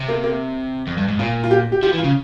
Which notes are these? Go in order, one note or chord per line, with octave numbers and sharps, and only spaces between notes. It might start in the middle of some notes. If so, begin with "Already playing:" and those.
Already playing: C3
A#3
A#3
F2
G2
G#2
A#2 F4
F4
G4
G4
F3 G4
E3
F4
C#3